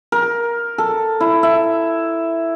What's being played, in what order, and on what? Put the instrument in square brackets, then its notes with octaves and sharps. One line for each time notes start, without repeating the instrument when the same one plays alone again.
[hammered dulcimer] A#4
A4
E4
E5